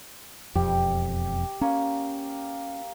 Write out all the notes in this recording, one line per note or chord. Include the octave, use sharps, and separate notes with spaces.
E1 F2 G4
A#3 C#4